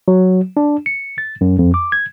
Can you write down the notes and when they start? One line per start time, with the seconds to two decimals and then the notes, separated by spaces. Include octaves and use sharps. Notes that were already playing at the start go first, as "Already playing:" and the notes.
0.08 F#3
0.57 D4
0.86 C#7
1.18 A6
1.41 F#2
1.59 F2
1.74 D6
1.92 G#6